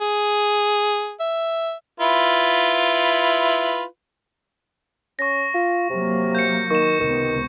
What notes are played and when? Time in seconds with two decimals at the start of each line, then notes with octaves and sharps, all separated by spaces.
0.01 G#4
1.20 E5
2.00 E4 F4 B4
5.19 C#4 C#6 A#6
5.55 F4
5.90 C3 F#3 A#3
6.35 G6 C#7
6.70 D#3 C#6 E7
7.01 C#2 C3 D#3 B3